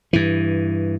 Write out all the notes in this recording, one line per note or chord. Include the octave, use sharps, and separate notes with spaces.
G2 E3